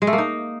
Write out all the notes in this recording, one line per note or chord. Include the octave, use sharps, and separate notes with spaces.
G#3
A3
A#3
D#4